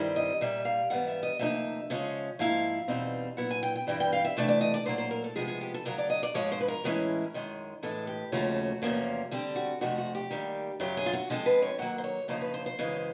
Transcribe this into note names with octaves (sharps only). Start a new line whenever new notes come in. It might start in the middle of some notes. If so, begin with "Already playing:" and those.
Already playing: G2 D#3 G3 C4 E4
D#5
A#2 G3 A#3 E5
F5
G#2 E3 G3 B3 F#5
E5
D#5
D2 C3 F3 A#3 D#4 E5
C#3 F3 G#3 C#4
G#2 F3 A#3 E4 F5
E2 B2 G3 C4 D#4
A#2 F#3 B3 E4 F#5
G#5
G5
G5
G2 E3 G3 C4 E4 G5
G5
F5
E5
C3 E3 A3 D4 D5
D5
D#5
D5
A#2 F#3 A#3 C5
C5
A#4
A4
C3 F3 G#3 B3 G#4
G#4
G4
A4
D2 C#3 F#3 A#4
D5
D#5
D5
G#2 F3 G#3 C#5
C5
B4
A#4
A2 E3 G#3 C#4 E4
F#2 D#3 G#3
A2 E3 G#3 A4
G4
D#2 C#3 F3 A3 C#4 F#4
E2 C3 F3 A#3 C#4
D3 G3 C4 G4
F#4
F2 C3 F3 A3 F#4
F#4
G4
D#3 G3 A#3
F#2 C#3 F#3 G4
G#4
F4
F#4
D3 F3 G#3 C4 A4
B4
C#5
D#3 F#3 A#3 F#5
C5
C#5
F#2 C#3 F3 A#3 D#4 C5
B4
C5
C5
F#2 C#3 E3 G#3